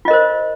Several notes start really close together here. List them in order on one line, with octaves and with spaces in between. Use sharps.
F4 D#5 A#4 C5